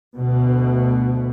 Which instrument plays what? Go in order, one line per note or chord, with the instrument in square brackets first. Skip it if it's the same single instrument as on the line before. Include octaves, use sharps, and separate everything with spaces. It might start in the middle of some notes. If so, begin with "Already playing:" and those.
[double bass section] D2 B2